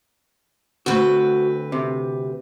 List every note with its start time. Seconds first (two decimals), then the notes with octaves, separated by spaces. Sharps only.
0.86 D2 C4 F#4 B4
1.72 C3